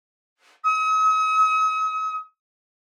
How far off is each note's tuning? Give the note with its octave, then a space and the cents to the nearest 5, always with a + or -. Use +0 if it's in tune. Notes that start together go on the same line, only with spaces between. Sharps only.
D#6 +45